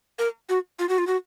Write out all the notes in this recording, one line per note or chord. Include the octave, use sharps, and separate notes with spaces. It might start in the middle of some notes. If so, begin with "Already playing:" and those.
A#4
F#4
F4
F#4
F4
F#4